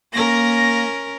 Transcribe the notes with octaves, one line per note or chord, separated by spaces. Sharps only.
A#3 C#4 A#4 A#6